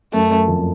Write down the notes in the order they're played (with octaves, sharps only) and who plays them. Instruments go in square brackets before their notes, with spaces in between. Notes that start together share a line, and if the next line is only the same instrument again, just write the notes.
[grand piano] F#2 [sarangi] A3
[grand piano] F#2
F2